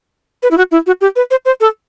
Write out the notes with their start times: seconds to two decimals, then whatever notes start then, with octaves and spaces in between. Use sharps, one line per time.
0.43 B4
0.51 E4
0.58 F#4
0.71 E4
0.87 F#4
1.01 G4
1.16 B4
1.31 C5
1.45 C5
1.61 A4